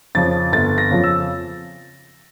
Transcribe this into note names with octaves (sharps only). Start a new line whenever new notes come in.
F2 C#3 F3 A6
G1 A6
A#6
F2 C#3 F3
E6